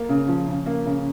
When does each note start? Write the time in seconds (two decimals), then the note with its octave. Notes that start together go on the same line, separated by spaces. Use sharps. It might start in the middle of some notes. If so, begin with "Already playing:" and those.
Already playing: A#3
0.09 C#3
0.28 F3
0.48 C#3
0.66 A#3
0.86 C#3